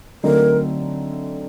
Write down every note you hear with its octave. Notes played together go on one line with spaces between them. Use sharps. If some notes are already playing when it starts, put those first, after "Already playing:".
D3 F#3 A3 C4 D#4 A#4